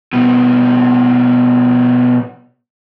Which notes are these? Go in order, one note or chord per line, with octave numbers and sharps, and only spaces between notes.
B2 G3